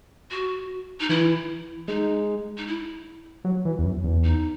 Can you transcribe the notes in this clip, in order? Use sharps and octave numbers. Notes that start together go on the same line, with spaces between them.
F#4
D#4
E3 E4
G#3 D#4
D#4
E4
F#3
E3
E2
F#2
E2
D#4